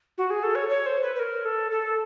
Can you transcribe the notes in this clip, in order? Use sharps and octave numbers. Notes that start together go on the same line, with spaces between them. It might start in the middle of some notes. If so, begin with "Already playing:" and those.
F#4
G#4
A4
C#5
C#5
C5
B4
B4
A#4
A4
A4